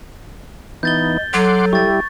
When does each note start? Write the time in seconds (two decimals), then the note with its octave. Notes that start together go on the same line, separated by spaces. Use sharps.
0.83 E3 B3 D#4 D#5 G6 A6 G7
1.33 F#3 A4 F#5 C6 D6
1.73 G3 E4 G4 C#6 A6